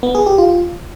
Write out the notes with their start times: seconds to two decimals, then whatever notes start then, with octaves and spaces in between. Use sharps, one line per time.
0.03 B3
0.15 G#4
0.26 G4
0.38 F4